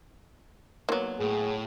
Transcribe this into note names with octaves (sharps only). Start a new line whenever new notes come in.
F3 F#3 A#3 B3
A2 G#4